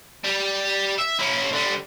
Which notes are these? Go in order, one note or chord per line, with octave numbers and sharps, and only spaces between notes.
G3
E5
C#4 E4
D3 G3